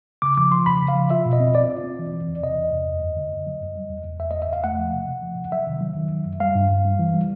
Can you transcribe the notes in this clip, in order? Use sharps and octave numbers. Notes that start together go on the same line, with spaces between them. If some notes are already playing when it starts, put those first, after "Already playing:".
C#3 D6
F3 D6
F3 C6
C#3 B5
C#3
F5
F3
F4 E5
B2
D#5
C4
F4 D5
F4
C4
E3
E3
E2
C3 D#5
E2
E2
F#2
F#2
D3
F#2
F#3
F#2
G3
E2
E2
E2 E5
E2 D#5
E5
E2 F5
A3 F#5
F3
C3
C3
F3
C3
F#3 E5
D#3
F#3
D#3
F#3
F#2
G3 F5
G2
G2
G3
E3
G3